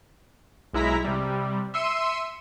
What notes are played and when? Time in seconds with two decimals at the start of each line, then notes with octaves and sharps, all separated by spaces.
0.74 B1 G#3 E4 A#5 B6
1.04 C3 G3
1.74 E5 C6 E6 C#7 D#7